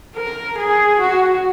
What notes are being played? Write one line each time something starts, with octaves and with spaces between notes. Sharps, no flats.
A#4
G#4
F#4